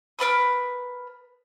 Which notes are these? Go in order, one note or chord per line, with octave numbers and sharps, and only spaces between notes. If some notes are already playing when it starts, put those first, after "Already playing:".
A#4 B4 B5 D#6